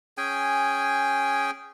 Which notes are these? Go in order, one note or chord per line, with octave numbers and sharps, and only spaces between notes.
C#4 G#4 G5 G#5